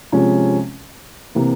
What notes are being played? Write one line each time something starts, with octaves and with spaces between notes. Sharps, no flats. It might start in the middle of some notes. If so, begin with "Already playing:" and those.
C3 F3 G#3 C#4
C3 E3 A#3